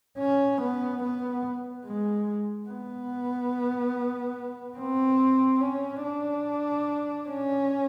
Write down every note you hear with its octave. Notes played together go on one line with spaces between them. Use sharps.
C#4
B3
B3
G#3
B3
C4
C#4
D4
C#4